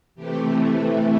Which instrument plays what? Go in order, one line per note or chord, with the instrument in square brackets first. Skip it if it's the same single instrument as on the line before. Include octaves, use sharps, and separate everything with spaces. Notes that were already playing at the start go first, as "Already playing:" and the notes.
[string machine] C3 E3 A3 G4